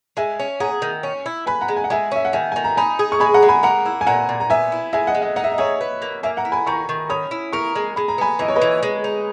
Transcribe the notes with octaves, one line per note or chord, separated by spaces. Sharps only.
G#3 E5 G#5
C#4
G#4 F#5 A#5
D#3
C#4
E4
B4 G#5 B5
F#5 A#5
G#3
G#5
F#5
G#3 E5 G#5
C#4 E5
F#5
D#3 E5 G#5
D#3 G#5
A#5
D#4 G#5 B5
G#4
C#6
G#3 G#5 B5
F#5 A#5
G#3
G#5 B5
A#3 F#5 A#5
E4
G#5
A#2 F#5 A#5
A#2
A#5
B3 E5 G#5
E4
G#3 E5 G#5
D#5 F#5
G#3
D#5 F#5
D#4 F#5
E5
D#5
G#4 C#5 E5
B4
A#3
A#3 E5 G#5
F#5 A#5
E4
G#5 B5
D#3 A#5 C#6
D#3
C#4 B5 D#6
E4
A#4 A#5 C#6
G#3
G#3 B5
A#5
B3 G#5 B5
E3 D#5
C#5
B4 D#5
E3
G#3
D#4